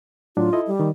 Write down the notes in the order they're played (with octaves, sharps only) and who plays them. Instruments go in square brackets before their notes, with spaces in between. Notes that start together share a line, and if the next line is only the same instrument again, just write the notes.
[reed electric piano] A2 F#3 D4 [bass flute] F4
[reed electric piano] E4 A4 D#5
[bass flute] G3
[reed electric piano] D#3